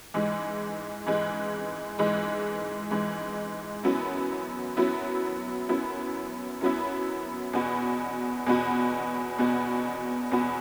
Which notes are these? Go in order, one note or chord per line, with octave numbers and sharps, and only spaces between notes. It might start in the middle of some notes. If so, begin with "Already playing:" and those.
G#2 E3 G#3
G#2 E3 G#3
G#2 E3 G#3
G#2 E3 G#3
F#2 F#3 B3 E4
F#2 F#3 B3 E4
F#2 F#3 B3 E4
F#2 F#3 B3 E4
E2 B2 B3 F#4
E2 B2 B3 F#4
E2 B2 B3 F#4
E2 B2 B3 F#4